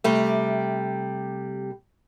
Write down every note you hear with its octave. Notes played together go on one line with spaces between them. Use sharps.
C3 G3 A3